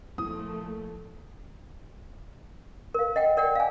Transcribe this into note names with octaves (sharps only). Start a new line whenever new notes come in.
A#2 F3 A3 E4 D#6
A#4 F5
D#5 F#5 G5
A#4 D5 F#5 G5
F5 G#5